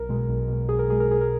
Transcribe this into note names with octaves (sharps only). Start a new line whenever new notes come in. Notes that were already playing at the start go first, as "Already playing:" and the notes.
Already playing: B1 A#4
B2 G#3
B1
B2 G#3
B1 G#4
A#4
B2 G#3 G#4
A#4
B1 G#4
A#4